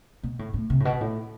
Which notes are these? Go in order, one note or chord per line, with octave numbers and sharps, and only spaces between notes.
B2
A2
A2
C3
A2
B2
A2